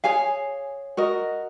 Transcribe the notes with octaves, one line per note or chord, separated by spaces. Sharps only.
G#4 C#5 F5 G#5
F#4 A#4 D#5